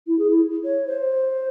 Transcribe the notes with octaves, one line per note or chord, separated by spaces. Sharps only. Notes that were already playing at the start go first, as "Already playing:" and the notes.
E4
G#4
E4
C#5
C5